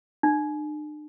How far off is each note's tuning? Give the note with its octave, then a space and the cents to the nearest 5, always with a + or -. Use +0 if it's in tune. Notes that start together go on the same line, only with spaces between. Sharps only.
D4 +45